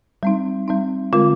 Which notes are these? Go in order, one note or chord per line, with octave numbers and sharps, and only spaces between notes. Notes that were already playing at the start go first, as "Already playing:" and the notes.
G3 C4 D#4
G3 C4 D#4
D3 G#3 C4 F4 A#4